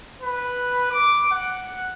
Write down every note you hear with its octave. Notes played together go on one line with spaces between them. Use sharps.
B4
D6
F#5